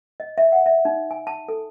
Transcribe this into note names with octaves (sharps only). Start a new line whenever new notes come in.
D#5
E5
F#5
E5
D#4
G#5
A5
A4